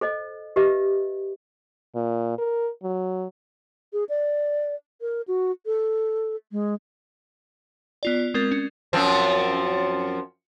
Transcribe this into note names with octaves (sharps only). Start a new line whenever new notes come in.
A4 C5 D#5
G4 B4 D#5 E5
A#2
A#4
F#3
G#4
D5
A#4
F#4
A4
G#3
B3 F4 D5
G#3 C4 A#4 A6
C#4
F#2 F3 C4